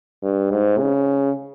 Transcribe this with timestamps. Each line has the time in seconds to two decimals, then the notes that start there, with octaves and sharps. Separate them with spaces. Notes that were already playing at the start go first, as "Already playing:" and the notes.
0.23 G2
0.51 G#2
0.80 C#3